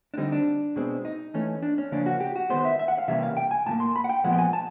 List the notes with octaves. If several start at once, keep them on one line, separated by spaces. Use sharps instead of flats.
D4
D3 G3 C4 D#4
D4
B2 G#3 C4
D#4
E3 A3 C#4
D4
C#4
C#3 F3 A#3 C#4 D4
F#4
G4
F#4
D#3 G#3 B3 C5
E5
E5
F#5
F5
C3 E3 G3 A#3 C#4 E5
F5
G5
G#5
A2 F3 A#3 A5
C6
B5
F#5
G5
A#2 F3 G#3 B3 F#5
G5
G#5
A5